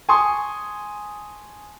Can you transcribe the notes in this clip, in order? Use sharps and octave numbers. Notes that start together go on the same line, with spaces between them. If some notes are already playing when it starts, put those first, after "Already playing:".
G#5 A5 C6 C#6 D#6